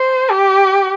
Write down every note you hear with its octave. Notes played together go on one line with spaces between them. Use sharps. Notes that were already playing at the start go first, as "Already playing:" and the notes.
Already playing: C5
G4